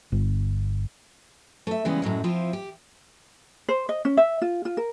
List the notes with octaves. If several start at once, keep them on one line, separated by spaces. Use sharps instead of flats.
G1
A3 E5
C#3 E3 G3 G#3 B3
F#2 A2 F#3 G#3
F3 C4 E4 F4
G4
C5
D#5
C#4
E5
F4
F4
A#4